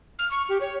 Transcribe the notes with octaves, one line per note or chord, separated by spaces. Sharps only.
F6
C#6
G4
C#5